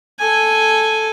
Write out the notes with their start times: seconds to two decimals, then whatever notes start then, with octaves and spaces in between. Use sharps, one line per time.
0.19 A4 G#5